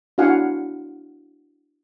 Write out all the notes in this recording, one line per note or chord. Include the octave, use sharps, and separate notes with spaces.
D4 E4 F#4 F5 F#5 G#5